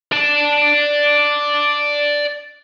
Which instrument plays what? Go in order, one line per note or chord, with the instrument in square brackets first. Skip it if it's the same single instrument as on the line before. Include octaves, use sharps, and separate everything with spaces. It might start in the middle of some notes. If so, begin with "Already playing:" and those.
[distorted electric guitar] D5 A5